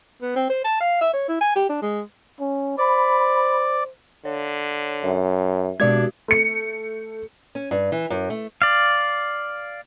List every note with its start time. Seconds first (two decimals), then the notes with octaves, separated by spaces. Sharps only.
0.22 B3
0.36 C4
0.50 C5
0.65 A5
0.81 F5
1.01 E5
1.13 C#5
1.29 E4
1.41 G#5
1.56 G4
1.69 D4
1.82 G#3
2.41 C#4
2.78 C5 D5 B5
4.25 D3 C#5
5.04 F#2 E5
5.80 B2 G#3 D4 F#4 G4 D5 G#6
6.28 A3 C#7
7.55 C#4
7.71 G2
7.92 E3
8.10 F#2
8.30 A3
8.62 D5 F5